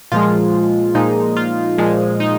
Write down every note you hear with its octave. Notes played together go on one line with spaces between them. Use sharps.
A#2 F3 G#3 F4
A#2 F3 G#3 D#4
F4
A#2 F3 G#3
D#4